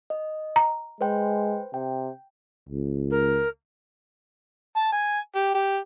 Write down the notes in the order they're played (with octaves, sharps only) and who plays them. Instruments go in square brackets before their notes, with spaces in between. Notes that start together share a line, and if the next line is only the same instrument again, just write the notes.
[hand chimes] D#5
[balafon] A#5
[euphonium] G#3 [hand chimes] B4 C5 G5
[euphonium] C3 [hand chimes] G5
[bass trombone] C#2
[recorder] A#4
[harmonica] A5
G#5
G4
G4